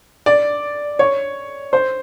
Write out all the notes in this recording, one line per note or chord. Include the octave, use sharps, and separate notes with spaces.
D5
C#5
C5